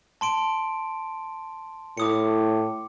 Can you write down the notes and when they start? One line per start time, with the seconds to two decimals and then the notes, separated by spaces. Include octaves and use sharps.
0.21 A5 C6 D7
1.97 A2 D6 D#6 C#7